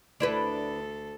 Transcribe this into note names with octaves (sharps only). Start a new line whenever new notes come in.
D2 D4 E4 A4 B4